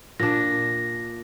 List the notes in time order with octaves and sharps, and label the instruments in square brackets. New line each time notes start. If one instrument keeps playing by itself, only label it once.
[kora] A#2 D4 [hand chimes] A#6